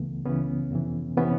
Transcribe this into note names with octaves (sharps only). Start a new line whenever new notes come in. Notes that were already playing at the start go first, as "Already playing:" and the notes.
Already playing: C#2 C#3 E3 A3 B3
C#2 C#3 E3 B3 C#4
F2 C3 E3
C3 E3 B3 C#4